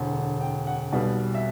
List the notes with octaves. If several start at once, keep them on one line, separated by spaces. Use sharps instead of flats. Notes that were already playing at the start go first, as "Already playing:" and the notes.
Already playing: E1 D2 D3
G5
F#5
B1 B2 G3 B3
E5